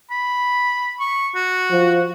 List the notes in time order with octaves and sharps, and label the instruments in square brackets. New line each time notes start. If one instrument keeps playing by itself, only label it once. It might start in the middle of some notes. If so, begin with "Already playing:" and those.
[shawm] B5
C#6
F#4
[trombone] F3